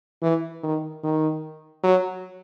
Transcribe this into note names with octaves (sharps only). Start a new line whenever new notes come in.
E3
D#3
D#3
F#3